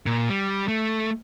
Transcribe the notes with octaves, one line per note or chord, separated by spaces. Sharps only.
A#2
G3
A3